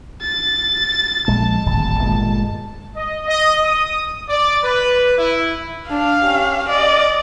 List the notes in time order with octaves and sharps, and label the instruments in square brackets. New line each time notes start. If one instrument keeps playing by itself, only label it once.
[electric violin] A6
[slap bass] A#1 G#3 [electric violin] A5
[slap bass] D1 G#1
G1 A#2 G#3
[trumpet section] D#5
D#5
D#6
D5
B4
E4
[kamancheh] D4 [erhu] F5
[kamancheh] C#4 G4
[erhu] D5 [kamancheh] D#5